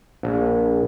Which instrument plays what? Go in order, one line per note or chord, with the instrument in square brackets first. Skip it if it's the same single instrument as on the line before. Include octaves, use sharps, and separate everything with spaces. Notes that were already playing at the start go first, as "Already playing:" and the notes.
[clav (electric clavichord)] A#1